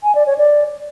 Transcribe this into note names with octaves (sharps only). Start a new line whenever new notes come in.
G#5
D5
C#5
D5